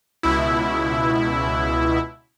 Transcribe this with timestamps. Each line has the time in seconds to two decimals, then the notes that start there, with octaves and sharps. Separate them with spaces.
0.23 C#2 B2 E4